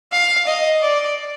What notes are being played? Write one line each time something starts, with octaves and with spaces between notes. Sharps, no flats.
F5
D#5
D5